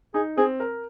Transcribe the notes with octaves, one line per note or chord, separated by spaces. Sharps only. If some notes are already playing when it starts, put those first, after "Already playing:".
D#4 G#4
C4 G#4
A#4